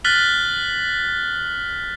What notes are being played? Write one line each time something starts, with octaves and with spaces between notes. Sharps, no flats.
F6 F#6 A6 B6 F#7 G7